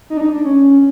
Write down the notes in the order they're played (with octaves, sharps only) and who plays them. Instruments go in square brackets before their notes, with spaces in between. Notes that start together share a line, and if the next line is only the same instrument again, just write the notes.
[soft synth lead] D#4
D4
D#4
D4
C#4